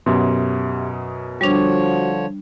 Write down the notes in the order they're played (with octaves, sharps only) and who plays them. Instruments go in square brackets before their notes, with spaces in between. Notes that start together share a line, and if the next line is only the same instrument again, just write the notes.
[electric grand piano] F#2 B2 [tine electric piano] G4 E5 C6
[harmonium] D3 F3 C#5 [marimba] G3 D4 [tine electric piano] F#4 C5